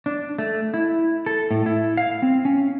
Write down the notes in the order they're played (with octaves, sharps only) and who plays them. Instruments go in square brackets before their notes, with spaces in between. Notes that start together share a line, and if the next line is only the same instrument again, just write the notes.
[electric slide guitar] D4
A3
E4
A4
A2
E4
F5
C4
C#4